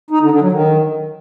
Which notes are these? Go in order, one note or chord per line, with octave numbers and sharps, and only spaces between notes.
D#4
D3
D3
F#3
D#3